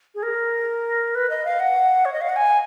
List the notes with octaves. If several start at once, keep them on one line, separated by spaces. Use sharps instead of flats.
G#4
A#4
B4
D#5
F5
F#5
C#5
D#5
F5
F#5
G#5